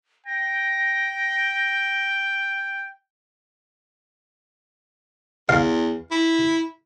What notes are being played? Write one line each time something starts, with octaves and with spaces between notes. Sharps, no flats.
G5 A#6
E2 F5
E4